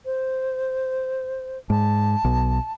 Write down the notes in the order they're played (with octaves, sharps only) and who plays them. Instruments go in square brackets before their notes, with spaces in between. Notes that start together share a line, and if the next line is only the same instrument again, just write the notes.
[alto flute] C5
[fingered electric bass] G#2 [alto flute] A5
[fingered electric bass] B1